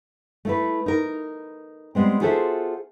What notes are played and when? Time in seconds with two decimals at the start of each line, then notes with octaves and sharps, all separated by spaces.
0.45 A3 E4 B4
0.86 D#4 A#4
1.95 G3 G#3 B3 C4
2.21 F4 F#4 G#4 A4 C5 E5